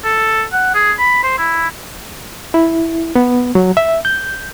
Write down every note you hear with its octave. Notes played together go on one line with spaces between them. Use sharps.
A4
F#5
G#4
B5
C5
E4
E4
B3
F#3
E5
G6